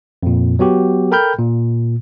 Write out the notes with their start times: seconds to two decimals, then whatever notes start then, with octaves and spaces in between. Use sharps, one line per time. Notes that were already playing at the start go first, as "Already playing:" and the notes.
0.23 F2 A#2
0.59 F#3 B3 F#4 G4
1.11 A4 A#4 G5 B5 F6 G6
1.38 A#2